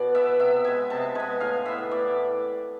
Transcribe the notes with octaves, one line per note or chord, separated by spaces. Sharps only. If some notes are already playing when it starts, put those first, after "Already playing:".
Already playing: B2 D5
B3 E5
C3 E5
G#3 B3 G#5
C3 A5
G#3 B3 G#5
A2 F5
E3 B3 E5
A2 D5